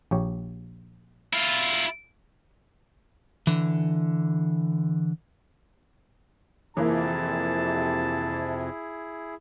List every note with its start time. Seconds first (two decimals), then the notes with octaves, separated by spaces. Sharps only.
0.11 A#1 G4 C#5
1.33 E4 F4
3.47 D3 E3
6.77 F2 C3 E3 A#3 E4 G#4 A5